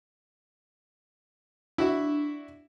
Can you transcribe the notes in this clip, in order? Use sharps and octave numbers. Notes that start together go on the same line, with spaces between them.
D4 E4 F#4 E5